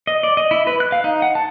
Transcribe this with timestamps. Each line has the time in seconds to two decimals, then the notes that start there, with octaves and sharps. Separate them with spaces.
0.07 D#5
0.23 D5
0.37 D#5
0.51 E4
0.67 B4
0.80 F#6
0.92 F5
1.04 D#4
1.22 F#5
1.35 A5